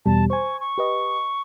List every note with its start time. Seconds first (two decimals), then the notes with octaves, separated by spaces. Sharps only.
0.06 E2 B2 G3 A5
0.30 C5 G#5 C#6
0.60 C#6
0.78 G4 B4 D#5